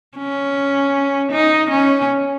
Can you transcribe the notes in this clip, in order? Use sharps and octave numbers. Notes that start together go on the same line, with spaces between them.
C#4
D#4
C#4